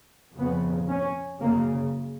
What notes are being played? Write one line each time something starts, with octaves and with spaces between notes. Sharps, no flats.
F2 C#3 B3
C#4
F#2 C#3 A#3